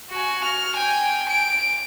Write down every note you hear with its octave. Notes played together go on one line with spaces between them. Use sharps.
F#4 G#5
F6
G5 G#5
D7